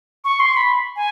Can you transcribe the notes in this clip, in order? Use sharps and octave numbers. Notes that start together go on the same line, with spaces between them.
C#6
C6
B5
G#5